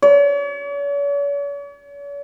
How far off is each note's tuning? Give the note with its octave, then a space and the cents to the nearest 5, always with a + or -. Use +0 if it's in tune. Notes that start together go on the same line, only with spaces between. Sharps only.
C#5 +45